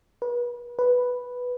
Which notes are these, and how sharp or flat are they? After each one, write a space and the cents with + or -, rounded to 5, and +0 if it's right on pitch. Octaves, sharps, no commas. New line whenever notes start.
B4 -35
B4 +0